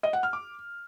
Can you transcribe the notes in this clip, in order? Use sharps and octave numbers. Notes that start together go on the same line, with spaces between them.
D#5
F#5
F6
D6